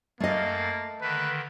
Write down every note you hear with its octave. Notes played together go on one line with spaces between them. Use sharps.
F#2 A3 A#3 D#5 F5 A6
D3 D#3 B4